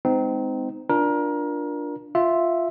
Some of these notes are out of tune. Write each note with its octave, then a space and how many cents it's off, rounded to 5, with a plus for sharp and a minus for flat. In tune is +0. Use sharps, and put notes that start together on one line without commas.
G#3 +0 C4 -25 D#4 +0
D4 +0 F4 +0 A#4 +25
F4 +0 E5 +0